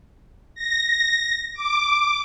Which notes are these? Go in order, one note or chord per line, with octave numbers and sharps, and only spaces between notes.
A#6
D6